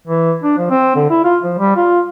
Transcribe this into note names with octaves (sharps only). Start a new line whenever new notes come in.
E3
D4
F3
C4
D3
E4
F4
F3
G3
F4